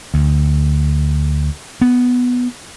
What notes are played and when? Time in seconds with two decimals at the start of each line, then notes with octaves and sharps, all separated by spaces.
0.14 D2
1.81 B3